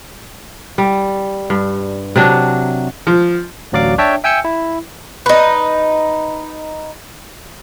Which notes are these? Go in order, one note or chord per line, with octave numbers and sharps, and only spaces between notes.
G3
G2
C3 F#3 D4
F3
A1 D2 F#3 D5 F5 D6
D4 C#5 E5 G5 A5
E5 G5 G#5 E6 G6 C#7
E4
D#4 B4